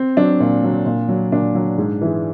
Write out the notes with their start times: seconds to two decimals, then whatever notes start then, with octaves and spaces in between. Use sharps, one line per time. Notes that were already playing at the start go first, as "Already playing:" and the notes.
Already playing: C4
0.17 F#3 D4
0.40 A#2
0.63 F#3
0.86 A#2
1.09 F#3
1.32 A#2 D4
1.55 F#3
1.78 G#2
2.01 E3 G#3